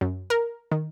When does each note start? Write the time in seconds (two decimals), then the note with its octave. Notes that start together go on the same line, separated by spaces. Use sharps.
0.01 F#2
0.30 A#4
0.72 D#3